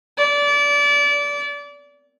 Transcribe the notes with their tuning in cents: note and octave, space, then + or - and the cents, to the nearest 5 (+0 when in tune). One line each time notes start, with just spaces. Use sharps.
D5 -25